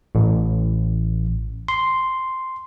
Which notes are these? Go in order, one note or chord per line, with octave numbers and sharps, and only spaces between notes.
A1
C6